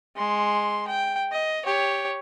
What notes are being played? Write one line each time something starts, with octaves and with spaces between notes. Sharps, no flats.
G#3 C6
G5
D#5
G4 C#5